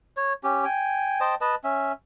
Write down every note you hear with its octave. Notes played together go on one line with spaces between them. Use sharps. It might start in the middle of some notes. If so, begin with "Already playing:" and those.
C#5
C#4 G4
G5 G#5
C5 D#5 G5 A5
B4 D#5 A5
C#4 E5